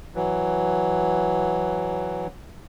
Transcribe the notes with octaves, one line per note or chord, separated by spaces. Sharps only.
E3 F#3